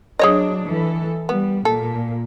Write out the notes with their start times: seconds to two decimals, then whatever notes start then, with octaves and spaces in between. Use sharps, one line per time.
0.19 F#3 D4 G#4 C#5 D#5
0.64 E3 A4
1.29 G3 B3
1.65 A#2 A4